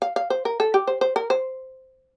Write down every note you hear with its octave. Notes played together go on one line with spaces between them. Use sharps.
F5
F5
C5
A#4
A4
G4
C5
C5
A#4
C5